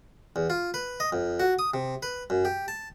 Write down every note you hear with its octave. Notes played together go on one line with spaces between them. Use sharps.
E2
F4
B4
D#5
F2
F#4
D#6
C3
B4
F#2
G4
A5